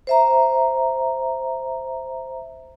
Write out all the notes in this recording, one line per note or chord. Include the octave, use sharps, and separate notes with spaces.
C5 E5 A#5